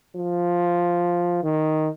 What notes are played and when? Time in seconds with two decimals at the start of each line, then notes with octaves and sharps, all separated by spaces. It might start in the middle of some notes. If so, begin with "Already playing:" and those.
0.16 F3
1.44 D#3